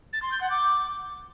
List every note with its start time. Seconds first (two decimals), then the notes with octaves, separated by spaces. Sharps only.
0.13 A6
0.22 C6
0.32 G6
0.41 F#5
0.50 D6